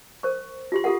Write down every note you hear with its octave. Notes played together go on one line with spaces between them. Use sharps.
A#4 C5 C#6
F4 G4 C6
F4 G4 A4 A#4 F#5